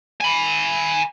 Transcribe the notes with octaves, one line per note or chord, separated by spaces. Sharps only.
G#5 B5